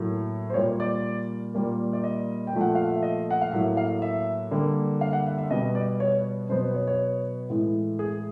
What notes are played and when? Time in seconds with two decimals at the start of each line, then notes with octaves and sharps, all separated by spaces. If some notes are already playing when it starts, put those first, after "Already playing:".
Already playing: A2 F#3 A#3
0.50 C5
0.54 A#2 G3 A#3 C#5
0.80 D5
1.54 A#2 G3 A#3
1.93 D5
2.04 D#5
2.47 G5
2.53 A#2 F3 A3
2.61 F#5
2.75 F5
2.88 E5
3.03 D#5
3.31 F#5
3.41 F5
3.52 A2 F#3 A#3 E5
3.77 F5
4.02 E5
4.51 D3 G3 A#3
5.01 F5
5.13 F#5
5.27 E5
5.38 E5
5.51 B2 G3 B3 D#5
5.75 D5
6.00 C#5
6.50 B2 F#3 B3 C5
6.62 C5
6.74 C#5
6.88 C#5
7.50 A2 E3 G#3
7.99 G#4